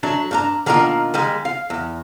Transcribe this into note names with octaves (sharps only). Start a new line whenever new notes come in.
F#3 A3 D4
G2 D4 A#5
B2 D#3 A#3 D4 F4 A#4
D#2 G3 G#3
F5
E2